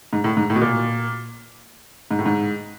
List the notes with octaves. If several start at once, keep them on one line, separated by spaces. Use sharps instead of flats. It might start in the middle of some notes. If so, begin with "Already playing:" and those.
G#2
A2
G#2
A2
B2
A#2
G#2
A2
G#2